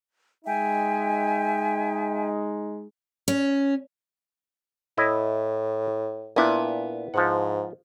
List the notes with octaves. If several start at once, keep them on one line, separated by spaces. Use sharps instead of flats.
G#3 D#4 E5 G5 G#5
C#4
A2 E4 D#5
A#2 B3 D4 E4
G#2 F3 F#5